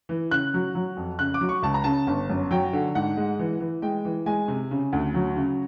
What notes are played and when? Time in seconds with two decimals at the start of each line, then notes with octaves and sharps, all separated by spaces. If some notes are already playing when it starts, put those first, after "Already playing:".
0.09 E3
0.31 C#3 F#6
0.54 F#3
0.75 F#3
0.97 F2
1.19 C#3 F#6
1.34 D6
1.41 F#3
1.49 C#6
1.63 C#2 A5
1.74 A#5
1.84 C#3 A5
2.07 G1
2.30 F#2
2.51 F#3 G5
2.73 D3
2.95 G#2 F#5
3.17 G#3
3.39 E3
3.60 E3
3.82 G#3 G5
4.05 E3
4.26 G#3 G#5
4.48 C3
4.71 C#3
4.93 D2
5.15 F#3
5.36 C#3